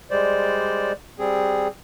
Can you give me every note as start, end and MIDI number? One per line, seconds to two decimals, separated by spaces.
0.11 0.92 55
0.11 0.92 56
0.11 0.92 72
0.11 0.92 74
1.19 1.68 55
1.19 1.68 60
1.19 1.68 68